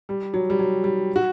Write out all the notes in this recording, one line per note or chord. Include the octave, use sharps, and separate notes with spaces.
G3
F#3
G3
F#3
G3
F#4